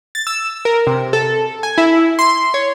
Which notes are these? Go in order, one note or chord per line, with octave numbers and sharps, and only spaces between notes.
A6
E6
A#4
C3
A4
G#5
E4
C6
C#5